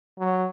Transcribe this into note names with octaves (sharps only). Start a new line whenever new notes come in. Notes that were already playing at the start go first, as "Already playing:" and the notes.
F#3